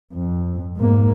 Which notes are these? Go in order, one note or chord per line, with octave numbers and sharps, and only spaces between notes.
F2
G#2 A#3